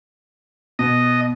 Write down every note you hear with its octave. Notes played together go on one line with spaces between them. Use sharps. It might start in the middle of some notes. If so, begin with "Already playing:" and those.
B2 D#5